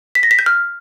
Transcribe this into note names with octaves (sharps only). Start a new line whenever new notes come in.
B6
A#6
B6
G6
F6